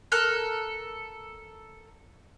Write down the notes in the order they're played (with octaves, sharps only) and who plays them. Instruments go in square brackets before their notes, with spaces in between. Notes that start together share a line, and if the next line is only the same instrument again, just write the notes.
[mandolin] A4 A#4 F6 F#6